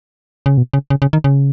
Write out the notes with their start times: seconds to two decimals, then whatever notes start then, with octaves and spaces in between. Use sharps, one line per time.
0.46 C#3
0.57 B2
0.74 C#3
0.90 C#3
1.02 C#3
1.13 D#3
1.24 C#3